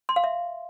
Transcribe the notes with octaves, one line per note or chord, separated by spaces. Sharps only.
C6
F5
E5